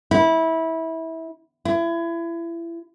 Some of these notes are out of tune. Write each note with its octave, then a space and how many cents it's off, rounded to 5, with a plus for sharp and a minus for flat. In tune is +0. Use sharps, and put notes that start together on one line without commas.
E4 -20
E4 +30